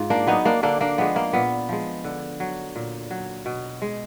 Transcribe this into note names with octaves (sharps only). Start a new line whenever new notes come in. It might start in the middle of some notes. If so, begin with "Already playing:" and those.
Already playing: G#2 F4
A#3 D4
F#3 B3 D#4
A#3 D4
D3 A#3 D4
A#3 D4
F3 G#3 B3
A#3
A#2 B3
F3 G#3
D3
F#3
A#2
F#3
B2
G#3